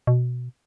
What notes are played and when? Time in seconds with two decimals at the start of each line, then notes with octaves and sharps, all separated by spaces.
0.07 B2